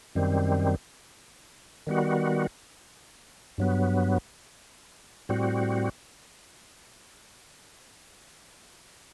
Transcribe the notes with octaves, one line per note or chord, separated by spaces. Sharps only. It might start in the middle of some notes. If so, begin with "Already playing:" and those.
F#2 D#3 G3 C4
D#3 G3 B3 F#4
G2 F#3 B3
A2 G3 C4 F#4